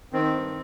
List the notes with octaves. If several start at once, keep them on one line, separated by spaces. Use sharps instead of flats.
D#3 C4
G2